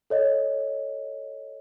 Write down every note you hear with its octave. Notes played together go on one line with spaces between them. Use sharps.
A4 C#5 D#5